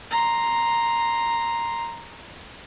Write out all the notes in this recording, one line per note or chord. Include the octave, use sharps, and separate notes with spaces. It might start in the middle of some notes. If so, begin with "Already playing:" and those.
A#5 C6